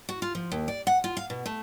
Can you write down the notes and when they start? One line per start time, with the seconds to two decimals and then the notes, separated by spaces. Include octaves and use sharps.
0.09 F#4
0.22 F4
0.35 F3
0.52 D#2
0.68 D5
0.87 F#5
1.04 F4
1.17 F5
1.30 B2
1.46 A3